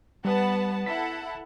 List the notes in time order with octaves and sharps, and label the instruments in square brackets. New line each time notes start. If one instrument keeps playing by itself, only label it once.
[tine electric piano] G3 [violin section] B3 F#5 A5
[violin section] E4 A4 F#5 [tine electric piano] B6